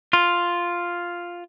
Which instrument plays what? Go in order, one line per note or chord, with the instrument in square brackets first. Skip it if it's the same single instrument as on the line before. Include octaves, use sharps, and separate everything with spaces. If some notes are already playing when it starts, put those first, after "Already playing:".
[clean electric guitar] F4